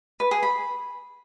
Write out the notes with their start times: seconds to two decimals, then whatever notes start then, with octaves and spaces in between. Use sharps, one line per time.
0.20 B4
0.31 G#4
0.43 B5